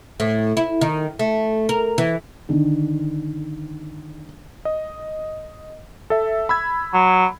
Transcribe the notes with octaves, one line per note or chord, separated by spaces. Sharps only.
A2
E4
D#3
A3
A#4
E3
D3 D#3
D#5
A4 E5
B5 E6 G#6
F#3